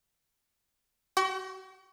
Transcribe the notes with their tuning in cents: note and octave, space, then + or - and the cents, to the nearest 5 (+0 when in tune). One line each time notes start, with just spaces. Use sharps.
F#4 +35 G5 -45 C#6 -20